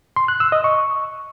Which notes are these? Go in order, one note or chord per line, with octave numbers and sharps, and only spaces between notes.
C6
F#6
E6
D#5
C#6